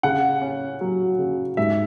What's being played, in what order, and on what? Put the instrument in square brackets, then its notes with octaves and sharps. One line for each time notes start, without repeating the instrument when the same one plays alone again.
[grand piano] C#3 F#5
C#4
F#3
C#3
G#2 E5